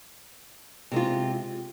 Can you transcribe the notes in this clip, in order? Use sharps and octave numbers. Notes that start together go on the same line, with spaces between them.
C3 G#3 F4